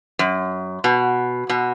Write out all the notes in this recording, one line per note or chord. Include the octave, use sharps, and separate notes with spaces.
F#2
B2
B2